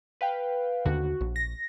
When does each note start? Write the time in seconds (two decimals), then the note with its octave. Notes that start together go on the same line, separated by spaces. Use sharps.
0.21 B4 F5 G5
0.86 D#2 D3 F#4
1.21 A#1
1.36 A#6